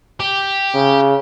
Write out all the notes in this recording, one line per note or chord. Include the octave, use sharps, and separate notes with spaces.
G4
C#3